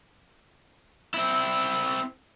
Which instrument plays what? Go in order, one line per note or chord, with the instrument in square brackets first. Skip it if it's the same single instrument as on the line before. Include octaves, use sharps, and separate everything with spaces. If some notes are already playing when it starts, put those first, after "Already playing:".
[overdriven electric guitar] C4 E4